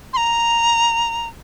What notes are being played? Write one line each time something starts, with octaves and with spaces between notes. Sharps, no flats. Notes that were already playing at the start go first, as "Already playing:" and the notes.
C6
A#5